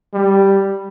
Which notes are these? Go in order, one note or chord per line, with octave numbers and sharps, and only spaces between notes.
G3